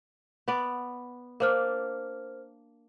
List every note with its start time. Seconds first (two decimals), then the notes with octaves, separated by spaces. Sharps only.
0.48 B3 B4 D5
1.40 A#3 D4 A#4 C5 F6